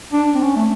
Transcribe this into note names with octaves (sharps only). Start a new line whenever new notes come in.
D4
C4
C#4
A3